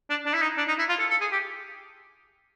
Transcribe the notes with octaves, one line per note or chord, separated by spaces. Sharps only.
D4
D4
E4
D#4
D4
D#4
E4
F4
A4
A4
G#4
G4